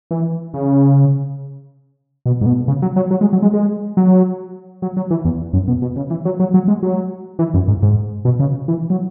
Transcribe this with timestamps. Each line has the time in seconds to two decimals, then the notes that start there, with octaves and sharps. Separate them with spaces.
0.11 E3
0.54 C#3
2.26 B2
2.41 G#2
2.46 B2
2.68 C#3
2.82 F#3
2.96 F#3
3.11 F#3
3.21 G#3
3.33 F#3
3.42 G#3
3.53 G#3
3.97 F#3
4.82 F#3
4.97 F#3
5.11 E3
5.25 E2
5.53 F#2
5.68 B2
5.82 B2
5.96 C#3
6.10 E3
6.25 F#3
6.40 F#3
6.54 F#3
6.68 G#3
6.83 F#3
7.39 E3
7.54 F#2
7.68 G#2
7.82 G#2
8.25 B2
8.39 C#3
8.68 E3
8.90 F#3